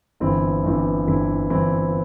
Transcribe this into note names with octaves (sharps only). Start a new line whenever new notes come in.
G1 G2 E3 C4 E4
G1 G2 E3 C4 E4
G1 G2 E3 C4 E4
G1 G2 E3 C4 E4